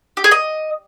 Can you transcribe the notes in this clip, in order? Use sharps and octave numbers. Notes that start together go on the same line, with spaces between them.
G4
G#4
D#5